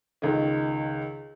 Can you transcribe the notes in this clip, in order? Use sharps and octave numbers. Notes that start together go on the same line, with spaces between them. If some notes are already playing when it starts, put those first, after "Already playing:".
C#2 D#3